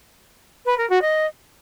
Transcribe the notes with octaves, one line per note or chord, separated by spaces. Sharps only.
B4
A#4
F#4
D#5